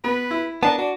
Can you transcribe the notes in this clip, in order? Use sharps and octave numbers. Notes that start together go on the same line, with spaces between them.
B3 B4
E4
B3 D4 A#4 A5
D4 F#4